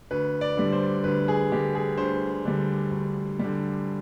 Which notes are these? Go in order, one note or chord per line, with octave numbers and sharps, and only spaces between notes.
D2 B4
D5
D3 G3
C5
D2 B4
G#4
D3 G3 G4
G#4
D2 C5
D3 G3
D2
D3 G3